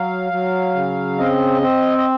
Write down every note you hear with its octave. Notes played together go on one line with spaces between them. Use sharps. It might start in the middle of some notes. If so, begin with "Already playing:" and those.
Already playing: F#3 F5
F#3
C#3
C4 D#5
C4
D#5